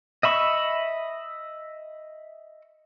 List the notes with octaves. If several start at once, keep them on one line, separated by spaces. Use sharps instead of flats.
D#5 E5 B5 C#6